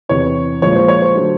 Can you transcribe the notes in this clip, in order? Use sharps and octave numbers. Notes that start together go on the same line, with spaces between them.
E2 C3 E3 C#5
A#1 A#2 F3 G#3 C#5
C5
C#5
C5
D3 F#3 A3